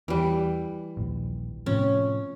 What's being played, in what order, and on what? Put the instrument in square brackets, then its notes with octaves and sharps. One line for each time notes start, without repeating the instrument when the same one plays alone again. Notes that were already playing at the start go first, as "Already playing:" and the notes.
[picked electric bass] E2 [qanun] E3 G3
[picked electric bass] D#1 A#1
[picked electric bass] A2 C3 F3 [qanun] C#4